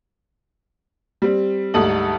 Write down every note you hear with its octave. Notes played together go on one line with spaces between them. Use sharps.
G3 C4
D2 G#2 G3 A4 D#6 F#7